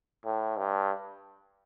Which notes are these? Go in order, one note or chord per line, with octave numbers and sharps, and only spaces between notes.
A2
G2